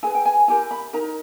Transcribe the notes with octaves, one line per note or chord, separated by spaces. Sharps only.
E4 G#4 B4 G#5
G5
G#5
E4 G4 A#4 G#5
B5
D#4 A#4 A#5